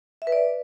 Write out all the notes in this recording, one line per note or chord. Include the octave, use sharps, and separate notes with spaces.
E5
B4
D5